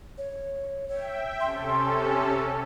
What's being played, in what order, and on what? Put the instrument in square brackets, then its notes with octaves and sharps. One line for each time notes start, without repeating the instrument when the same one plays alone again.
[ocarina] C#5
[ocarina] C#5 [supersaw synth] E5 G5
[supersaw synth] C3 C#4 A4 [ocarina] C6